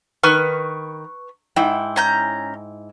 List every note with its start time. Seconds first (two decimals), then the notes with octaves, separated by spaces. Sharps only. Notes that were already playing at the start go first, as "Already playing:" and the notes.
0.24 D#3 B4 C#6 F6
1.56 G#2 E4 G5
1.96 C#4 A#5 G6